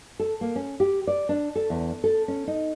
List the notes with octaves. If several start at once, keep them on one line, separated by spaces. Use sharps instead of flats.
A4
A#3
C#4
G4
D5
D4
A4
E2
A4
C#4
D#4